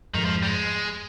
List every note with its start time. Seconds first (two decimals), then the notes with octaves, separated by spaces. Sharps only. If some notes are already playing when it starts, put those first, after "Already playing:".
0.14 F2 G#2 D#3
0.25 F3
0.43 G3
0.47 G#3